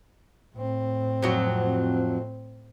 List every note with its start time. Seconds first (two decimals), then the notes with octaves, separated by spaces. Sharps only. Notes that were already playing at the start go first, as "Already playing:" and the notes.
0.55 A2 C4
1.23 F2 F#3 F#4